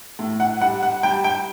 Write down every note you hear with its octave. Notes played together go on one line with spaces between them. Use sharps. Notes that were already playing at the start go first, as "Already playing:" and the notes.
A2
F#5
G3 F#5
F#5
G3 G5
G5